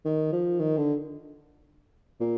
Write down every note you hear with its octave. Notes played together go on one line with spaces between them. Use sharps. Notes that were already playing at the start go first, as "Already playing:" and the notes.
D#3
F3
D#3
D3
A#2